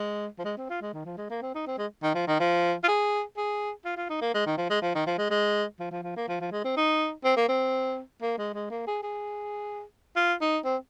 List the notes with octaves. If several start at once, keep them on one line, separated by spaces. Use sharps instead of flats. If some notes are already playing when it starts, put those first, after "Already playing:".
Already playing: G#3
F3
G#3
C4
F4
G#3
D#3
F3
G#3
A#3
C4
D#4
C4
G#3
D#3
F3
D#3
F3
F4
G#4
G#4
F4
F4
D#4
A#3
G#3
D#3
F3
G#3
F3
D#3
F3
G#3
G#3
F3
F3
F3
A#3
F3
F3
G#3
C4
D#4
C4
A#3
C4
A#3
G#3
G#3
A#3
G#4
G#4
F4
D#4
C4